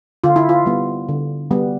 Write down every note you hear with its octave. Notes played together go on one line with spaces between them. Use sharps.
D3 F4
E4
F4
G3 B3
D3
G3 B3